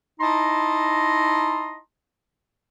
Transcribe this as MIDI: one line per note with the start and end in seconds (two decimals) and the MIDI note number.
0.20 1.78 63
0.20 1.78 64
0.20 1.78 75
0.20 1.78 81
0.20 1.78 82
0.20 1.78 84